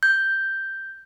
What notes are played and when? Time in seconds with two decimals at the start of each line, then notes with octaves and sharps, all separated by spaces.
0.03 G6